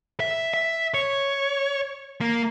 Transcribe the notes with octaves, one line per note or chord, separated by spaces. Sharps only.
E5
E5
C#5
A#3